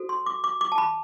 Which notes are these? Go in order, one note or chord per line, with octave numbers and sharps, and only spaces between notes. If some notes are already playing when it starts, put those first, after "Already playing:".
Already playing: F#4 A4 C5
C6
D6
D6
D6
A5
B5